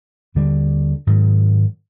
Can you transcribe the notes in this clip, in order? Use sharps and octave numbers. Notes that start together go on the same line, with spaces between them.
D#2 D3 G3
G#2 D#3 F#3